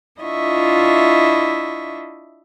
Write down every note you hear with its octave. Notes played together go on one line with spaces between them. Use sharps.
D4 E4 F4 D#5 E5 C#6